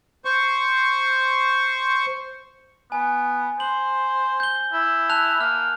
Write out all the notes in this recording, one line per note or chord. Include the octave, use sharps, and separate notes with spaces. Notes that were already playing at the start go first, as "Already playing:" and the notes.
C5 C#6
B3 G#5
C5 F#7
G6 G7
E4
A5 F#6 F7
A#3 F6